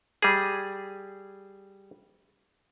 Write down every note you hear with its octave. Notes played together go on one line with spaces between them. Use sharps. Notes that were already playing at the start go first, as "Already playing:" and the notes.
G3 G#4